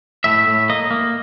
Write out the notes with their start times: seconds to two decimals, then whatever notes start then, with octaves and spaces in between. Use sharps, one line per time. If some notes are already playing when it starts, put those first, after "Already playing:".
0.24 A2 E5
0.47 A2
0.70 A#3 D#5
0.91 A#3